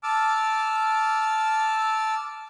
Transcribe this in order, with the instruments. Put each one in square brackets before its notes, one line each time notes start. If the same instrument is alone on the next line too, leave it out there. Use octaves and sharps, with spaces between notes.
[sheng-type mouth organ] A5 D6 E6 F6